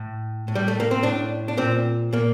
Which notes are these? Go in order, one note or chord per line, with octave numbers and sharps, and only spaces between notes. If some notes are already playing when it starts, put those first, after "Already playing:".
Already playing: A2
A2
G3
A3
A#3
C4
A2 D4
D4
A#2 C4
A#2 A#3